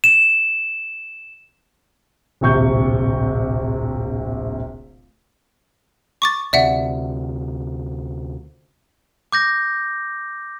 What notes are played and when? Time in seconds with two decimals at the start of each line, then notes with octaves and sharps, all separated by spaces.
0.04 E7
2.41 D1 A#1 C3 C#6 G6
6.22 C#6 D6 A6
6.53 D2 C3 D5 E5 F#5
9.32 D6 G6 A#6